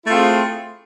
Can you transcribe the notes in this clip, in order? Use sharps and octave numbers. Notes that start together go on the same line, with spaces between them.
A3 C4 E4 F4 G#4